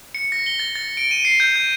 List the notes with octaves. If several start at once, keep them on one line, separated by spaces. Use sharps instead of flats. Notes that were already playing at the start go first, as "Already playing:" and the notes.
C#7
A#6
G7
A6
A6
D7
D#7
C7
G6
G6